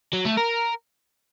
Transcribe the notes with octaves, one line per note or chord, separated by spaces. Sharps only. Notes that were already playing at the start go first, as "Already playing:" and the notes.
F#3
A3
A#4